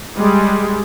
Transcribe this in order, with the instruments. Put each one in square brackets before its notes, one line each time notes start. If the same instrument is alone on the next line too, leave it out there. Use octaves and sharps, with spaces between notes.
[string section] G3 G#3